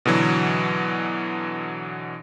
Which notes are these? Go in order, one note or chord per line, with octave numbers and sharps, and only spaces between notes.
B2 D3 E3 F#3